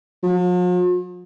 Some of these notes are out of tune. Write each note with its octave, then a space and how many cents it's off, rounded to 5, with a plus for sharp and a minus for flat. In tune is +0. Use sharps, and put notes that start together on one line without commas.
F3 +45